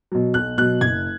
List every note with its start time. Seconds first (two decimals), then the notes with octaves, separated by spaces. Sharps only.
0.12 B2 F#3
0.34 B1 F#6
0.58 B2 F#3 F#6
0.81 F#1 G#6